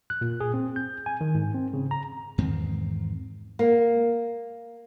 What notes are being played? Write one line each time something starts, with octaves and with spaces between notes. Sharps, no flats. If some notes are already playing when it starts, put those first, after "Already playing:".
F#6
A#2
G#4
C4
G6
G#5
D#3
G#2
C4
C#3
A#5
E2 G#2 D#3 C4
A#3